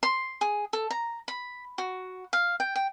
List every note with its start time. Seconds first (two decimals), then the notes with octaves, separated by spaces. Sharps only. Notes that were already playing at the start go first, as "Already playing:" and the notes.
0.03 C6
0.41 G#4
0.73 A4
0.91 A#5
1.28 B5
1.78 F#4
2.33 F5
2.60 G5
2.76 G5